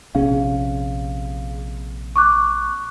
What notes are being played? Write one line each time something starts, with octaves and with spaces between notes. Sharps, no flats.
A#1 C3 C#4 G#4 F5
C#6 D6 F#6